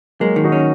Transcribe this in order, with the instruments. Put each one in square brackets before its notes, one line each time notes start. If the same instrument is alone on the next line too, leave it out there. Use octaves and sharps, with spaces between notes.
[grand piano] F#3 A#3 [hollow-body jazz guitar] G#3
[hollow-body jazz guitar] D#3
[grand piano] D#4 F#4
[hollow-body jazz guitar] C#4